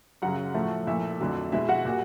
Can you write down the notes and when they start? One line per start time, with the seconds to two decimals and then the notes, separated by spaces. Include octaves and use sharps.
0.22 F#2 C#3 F#3 F#4 F#5
0.54 A2 F3 A3
0.87 A#2 F3 A3 E4 E5
1.20 F2 D3 F#3 A3
1.52 B2 G#3 E4 E5
1.69 F#4 F#5
1.85 A#2 G3